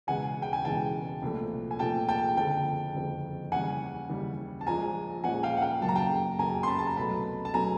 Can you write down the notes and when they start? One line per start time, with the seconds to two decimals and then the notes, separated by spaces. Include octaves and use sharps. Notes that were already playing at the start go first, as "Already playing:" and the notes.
0.07 E1 E2 C#3 E3 G#3 F#5 G#5
0.42 G5
0.53 G#5
0.65 E1 E2 C#3 E3 G#3 G5 A5
1.22 C2 A#2 F3 A3
1.71 G#5
1.79 C2 A#2 F3 A3 G5 A5
2.09 G5 A5
2.37 F#1 F2 D3 G5 A5
2.94 F#1 F2 D3
3.52 D#2 C#3 E3 G3 F#5 G#5
4.09 D#2 C#3 E3 G3
4.61 A5
4.67 A#1 A#2 F3 G#3 G#5 A#5
5.24 A#1 A#2 F3 G#3 F#5 G#5
5.43 F5 G5
5.57 F#5
5.62 F5 G5
5.82 F#2 C#3 F#3 A#3 A5
5.89 A#5
5.96 G5 A5
6.39 F#2 C#3 F#3 A#3 G#5 A#5
6.63 C6
6.68 A5 B5
6.79 A5
6.87 A#5
6.96 C2 B2 F#3 A3 A5 B5
7.45 A5
7.54 B2 F#3 A3 G#5 A#5